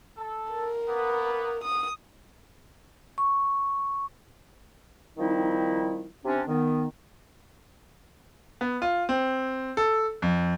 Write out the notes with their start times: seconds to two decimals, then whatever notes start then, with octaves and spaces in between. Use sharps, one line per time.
0.17 A4
0.51 A#4
0.88 A#3 B3
1.64 D#6
3.18 C#6
5.17 D#3 F3 G3 C4 D#4 E4
6.25 C3 C#4 D4
6.48 D#3 B3
8.61 B3
8.82 F4
9.09 C4
9.77 A4
10.22 F2